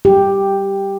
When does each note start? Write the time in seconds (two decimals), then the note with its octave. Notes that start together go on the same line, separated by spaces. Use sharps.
0.05 G4